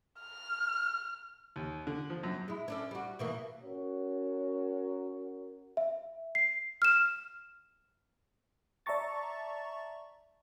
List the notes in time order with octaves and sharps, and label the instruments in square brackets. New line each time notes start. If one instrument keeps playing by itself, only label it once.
[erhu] F6
[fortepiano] D#2
D3
F3
F#2
[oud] G#3 E4
C#4 D4 A4
G3 F#4
B2 E3 A#3
[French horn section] C#4 F#4 A#4 C#5
[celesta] E5
C7
[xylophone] F6 E7
[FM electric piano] D5 E5 A5 A#5 C#6 A6